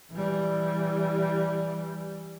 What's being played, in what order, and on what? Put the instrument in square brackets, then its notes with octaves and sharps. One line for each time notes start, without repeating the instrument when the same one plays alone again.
[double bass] E3 G3